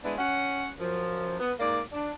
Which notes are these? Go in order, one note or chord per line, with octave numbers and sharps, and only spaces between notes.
G#3 B3 D4 E4 B4
C#4 F#5
F#2 F3
B3
G#2 A#3 D5
D4